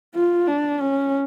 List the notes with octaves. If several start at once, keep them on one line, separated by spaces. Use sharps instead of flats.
F4
D4
C#4